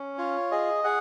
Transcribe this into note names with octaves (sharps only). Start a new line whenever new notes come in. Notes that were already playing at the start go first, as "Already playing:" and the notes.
Already playing: C#4
F4 C#5
G#4 D#5
G#4 F#5